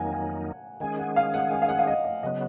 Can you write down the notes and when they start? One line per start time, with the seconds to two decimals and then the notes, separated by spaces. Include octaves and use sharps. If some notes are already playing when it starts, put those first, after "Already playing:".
Already playing: F2 D#3 F#3 A#3 D#4 F#5 G#5
0.13 G#5
0.80 D#3 G#3 C#4 G#4 G#5
0.99 F#5
1.16 F5
1.34 F#5
1.52 G#5
1.62 F5
1.69 F#5
1.79 F5
1.87 D#5
2.04 D#5
2.23 C#3 F#3 B3 D#5